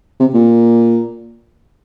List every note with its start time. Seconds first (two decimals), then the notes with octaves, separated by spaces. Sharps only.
0.20 C3
0.34 A#2